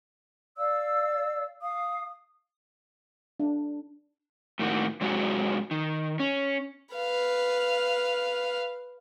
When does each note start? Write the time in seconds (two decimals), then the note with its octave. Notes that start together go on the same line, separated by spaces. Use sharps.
0.58 D5 F5 E6
1.62 F5 D#6
3.40 D4
4.59 A2 D#3 A#3 F#4
5.01 G#2 C3 F#3 G#3 F#4 G#4
5.71 D#3
6.20 C#4
6.96 B4 F5